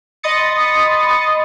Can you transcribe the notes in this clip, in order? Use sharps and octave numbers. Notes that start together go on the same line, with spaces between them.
D#5 B5 C6 D#6 A6 C#7